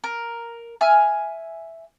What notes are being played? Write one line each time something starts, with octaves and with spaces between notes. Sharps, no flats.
A#4
E5 G#5 F6